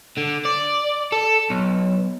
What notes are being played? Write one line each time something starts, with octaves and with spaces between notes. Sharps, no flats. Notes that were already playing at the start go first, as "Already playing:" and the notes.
D3
D5
A4
B1